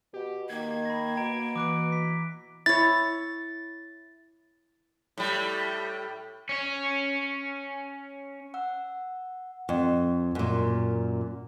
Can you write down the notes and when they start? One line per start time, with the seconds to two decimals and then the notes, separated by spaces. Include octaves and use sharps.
0.14 B2 G4
0.50 D#3 A#3 G#6
0.85 B5 A#6
1.17 B2 A#5 D7
1.56 E3 D6 F#6 D7
1.92 B6
2.66 E4 C#5 A6
5.18 A2 G3
6.49 C#4 C#5
8.54 F#5 E6
9.69 F2
10.35 F#2 A#2